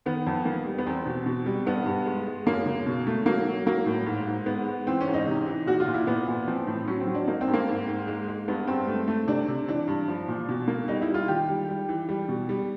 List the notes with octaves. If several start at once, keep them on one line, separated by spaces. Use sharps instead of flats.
D#3 B3
F2
A#3
G3
B3
E2 C4
B2
B2
G3
G2 B3
G2
G#3
G#3
F#2 A#3
C#3
B2
A3
F#3 A#3
F#3
F#3 A#3
A2
G#2
G#2
G#3 B3
G#3
E3 C4
C#4
G#2
D#4
C3
E3
A#2 F#4
F4
A#2
E4
A#2 B3
A#2
F3 C4
A2
F#3 C#4
C4
F#3
D4
A#3 D#4
C4
G2
A#3
G#2
G#2
G#3
G#3
G2 B3
G2 C4
A3
A3
C3 D4
C3
E3 D4
G2
F3
A#2
B2
A#3
G3 D#4
E4
G3
F4
D#3 G4
G3
G3
E3
G3
B2
G3